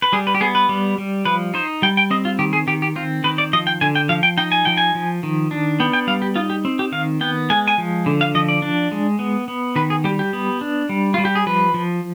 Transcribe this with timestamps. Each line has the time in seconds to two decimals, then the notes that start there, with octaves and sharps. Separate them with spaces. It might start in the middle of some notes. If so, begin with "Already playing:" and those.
0.02 B4
0.12 G3 G#4
0.27 B4
0.35 G4
0.41 B3 G#4
0.55 B4
0.69 G3
0.98 G3
1.25 F3 B4
1.54 D#4 C5
1.82 G3 G5
1.97 G5
2.10 C4 D#5
2.25 F4
2.39 D#3 G4
2.53 G#4
2.67 D#3 G4
2.82 G4
2.96 C4 F4
3.24 D#3 B4
3.38 D5
3.53 F3 D#5
3.67 G5
3.81 D3 G#5
3.95 G5
4.09 F3 F5
4.23 G5
4.37 D#4 G5
4.52 G#5
4.65 F3 G5
4.77 G#5
4.95 F3
5.23 D#3
5.51 D4
5.80 B3 G5
5.93 G5
6.07 G3 F5
6.22 G4
6.36 D#4 F4
6.50 G4
6.65 C4
6.79 G4
6.92 D#3 F5
7.21 B3 G5
7.50 G#3 G#5
7.68 G#5
7.78 F3
8.06 D3
8.21 F5
8.35 F3 D#5
8.49 D5
8.62 D4
8.91 G#3
9.19 B3
9.48 B3
9.76 D#3 B4
9.90 G#4
10.04 G3 G4
10.19 G4
10.33 B3
10.61 D4
10.89 G3
11.14 G3 F4
11.25 G4
11.35 G#4
11.46 F3 B4
11.74 F3